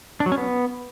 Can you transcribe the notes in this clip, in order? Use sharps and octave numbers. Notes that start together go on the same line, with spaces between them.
D4
F#3
C#4
B3